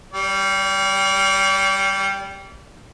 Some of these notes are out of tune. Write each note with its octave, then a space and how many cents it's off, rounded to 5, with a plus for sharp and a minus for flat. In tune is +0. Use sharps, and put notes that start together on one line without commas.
G3 +0 D5 -40